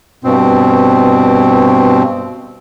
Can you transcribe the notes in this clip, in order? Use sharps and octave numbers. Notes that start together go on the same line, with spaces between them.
G2 B2 C4